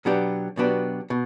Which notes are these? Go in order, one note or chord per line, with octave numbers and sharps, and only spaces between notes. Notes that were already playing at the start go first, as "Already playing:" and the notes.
B2 F#3 B3 D4 G4
B2 F#3 B3 D4 G4
B2